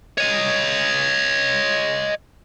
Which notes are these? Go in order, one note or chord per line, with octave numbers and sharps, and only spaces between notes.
C#5 D#5